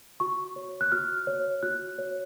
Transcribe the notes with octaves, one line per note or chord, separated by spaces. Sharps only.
F#4 C#6
C#5
F#6
F#4 F6
C#5
F#4 F#6
C#5